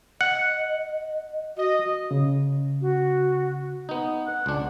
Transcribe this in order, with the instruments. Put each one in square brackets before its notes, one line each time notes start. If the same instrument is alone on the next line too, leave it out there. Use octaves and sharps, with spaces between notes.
[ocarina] D#5 [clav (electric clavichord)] F#5
[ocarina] F#4 [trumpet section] D#5
[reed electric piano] C#3
[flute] F#4
[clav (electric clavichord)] B3 D#4
[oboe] F#5
[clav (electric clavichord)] C#2 D4